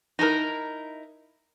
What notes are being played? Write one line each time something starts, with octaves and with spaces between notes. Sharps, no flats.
D#4 E4 A4 A#4